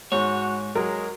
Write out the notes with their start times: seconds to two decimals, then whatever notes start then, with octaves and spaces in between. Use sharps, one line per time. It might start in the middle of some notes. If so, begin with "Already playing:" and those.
0.12 G#2 F#4 C#5
0.75 F#3 G#3 A#4